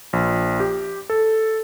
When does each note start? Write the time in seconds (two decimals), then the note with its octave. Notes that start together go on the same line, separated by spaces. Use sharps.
0.13 A#1
0.60 G4
1.10 A4